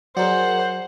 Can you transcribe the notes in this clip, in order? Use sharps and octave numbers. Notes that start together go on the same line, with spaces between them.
F#3 G#4 A#4 C5 D5 F#5